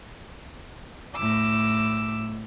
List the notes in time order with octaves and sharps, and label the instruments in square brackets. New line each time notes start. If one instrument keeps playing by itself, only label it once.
[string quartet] A2 D6 E6